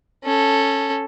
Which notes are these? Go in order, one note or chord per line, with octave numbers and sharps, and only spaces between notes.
C#4 A4